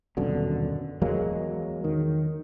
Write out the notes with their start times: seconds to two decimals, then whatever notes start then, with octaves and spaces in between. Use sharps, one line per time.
0.17 D#1 F#2 B2 D3
1.02 E2 F#3 G#3 A#3
1.84 D#3